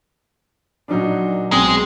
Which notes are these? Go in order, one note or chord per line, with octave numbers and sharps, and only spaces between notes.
A#2 F#3 D4 D#4
B1 G#3 C4 C6 F#7